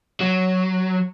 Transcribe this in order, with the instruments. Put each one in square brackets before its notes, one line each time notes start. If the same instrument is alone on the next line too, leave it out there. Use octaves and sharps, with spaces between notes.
[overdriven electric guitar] F#3